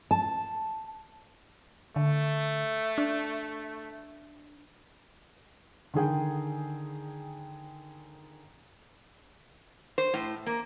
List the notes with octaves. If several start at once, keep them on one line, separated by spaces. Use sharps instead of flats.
A5
D3 A3
D4
D3 D#3 G#4 G5
C5
A2
A#3